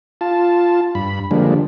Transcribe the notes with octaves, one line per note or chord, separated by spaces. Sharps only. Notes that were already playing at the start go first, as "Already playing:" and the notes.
F4 A5
G2 B5
D3 F3 G3 G#3 A#3 D4